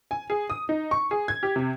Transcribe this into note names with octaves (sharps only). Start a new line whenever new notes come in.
G#5
G#4
D#6
D#4
C#6
G#4
G#6
G4
C3